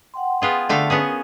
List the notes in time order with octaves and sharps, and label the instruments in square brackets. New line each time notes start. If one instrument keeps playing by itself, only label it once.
[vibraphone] F#5 G5 C6
[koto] B3 F4 G#4
D3 A3 F5
B3 C#4 G#4
[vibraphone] A#4